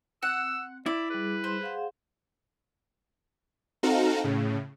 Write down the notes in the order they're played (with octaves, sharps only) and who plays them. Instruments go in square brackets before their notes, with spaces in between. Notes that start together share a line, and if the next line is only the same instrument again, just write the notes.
[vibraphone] C4 [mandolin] F#5 [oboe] E6
[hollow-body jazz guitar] E4 [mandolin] D5 [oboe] E5
[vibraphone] G3 G#4 [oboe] B4
[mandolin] C5
[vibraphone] G#4 F5 F#5
[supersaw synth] C4 D#4 F#4 A4 F5 A#5
A2 C#3